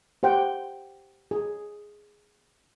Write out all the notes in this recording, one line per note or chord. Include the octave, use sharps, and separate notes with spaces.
G4 C5 F#5 G5
G#4